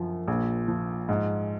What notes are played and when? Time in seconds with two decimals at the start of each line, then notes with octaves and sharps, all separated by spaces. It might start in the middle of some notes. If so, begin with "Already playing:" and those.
Already playing: F#2 F3
0.28 A#1
0.68 F3
1.09 G#2